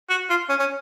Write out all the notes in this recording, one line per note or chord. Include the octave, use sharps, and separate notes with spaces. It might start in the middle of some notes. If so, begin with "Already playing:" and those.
F#4
F4
C#4
C#4